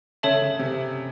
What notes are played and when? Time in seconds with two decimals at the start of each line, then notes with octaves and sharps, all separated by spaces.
0.23 C#3 A4 C#5 E5 A5
0.42 C#3
0.59 C3